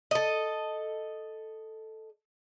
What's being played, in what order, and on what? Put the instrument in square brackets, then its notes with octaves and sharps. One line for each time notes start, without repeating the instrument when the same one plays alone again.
[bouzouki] A4 D#5